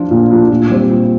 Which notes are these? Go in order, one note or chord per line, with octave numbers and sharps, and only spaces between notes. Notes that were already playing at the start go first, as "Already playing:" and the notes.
Already playing: F3 D4 F4
A#2
F3 D4 F4
A#2
G3 C4 G4
A#2